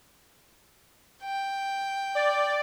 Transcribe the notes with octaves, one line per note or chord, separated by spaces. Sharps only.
G5
D5